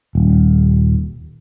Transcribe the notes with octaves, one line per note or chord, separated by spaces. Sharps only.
D#1